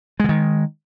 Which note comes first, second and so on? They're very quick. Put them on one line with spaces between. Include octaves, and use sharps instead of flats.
G#3 D3 D#3